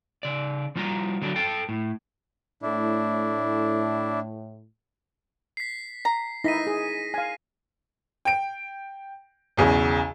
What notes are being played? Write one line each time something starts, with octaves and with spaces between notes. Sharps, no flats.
C#3 D5
F3 G3 F4 F5 A#5
D3 F#3 D4
A4 G5 A5
A2
A2 D4 E4
B6 C7
A#5
D#4 E4 A#6 B6 D#7
G#4
F5 G#5
G5 D7
B1 E2 C#3